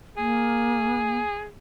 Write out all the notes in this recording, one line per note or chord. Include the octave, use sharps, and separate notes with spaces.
A#3 G#4